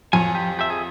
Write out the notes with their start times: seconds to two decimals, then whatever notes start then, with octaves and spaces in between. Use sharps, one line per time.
0.13 F2 C#5 G#5
0.35 G4
0.59 G4 E5
0.70 G#4